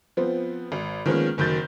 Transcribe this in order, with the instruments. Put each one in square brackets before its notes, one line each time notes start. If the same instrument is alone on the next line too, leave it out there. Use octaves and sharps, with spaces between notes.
[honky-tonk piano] F3 B3 C4
G#1
D#3 F3 G#3 A#3 B3 C#4
F#1 D#3 F#3 G6 A6